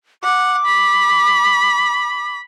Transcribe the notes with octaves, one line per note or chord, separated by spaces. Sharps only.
F#5 D6
B5